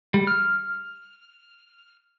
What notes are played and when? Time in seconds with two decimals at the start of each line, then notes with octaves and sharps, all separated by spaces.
0.14 G3
0.27 F6